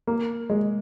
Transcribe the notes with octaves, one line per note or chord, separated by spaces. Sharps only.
A#3
G#3